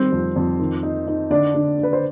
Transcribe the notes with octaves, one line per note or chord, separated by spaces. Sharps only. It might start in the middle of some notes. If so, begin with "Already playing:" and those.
Already playing: D#3 G3 C4 C5
F2
F2
D#3
D#4
D#4
D3 D4 D5
D3
D4
B4
C5